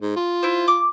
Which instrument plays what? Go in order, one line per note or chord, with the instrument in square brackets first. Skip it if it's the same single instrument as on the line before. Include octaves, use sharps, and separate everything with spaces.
[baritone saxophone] G#2
F4
[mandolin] E4 C5
D6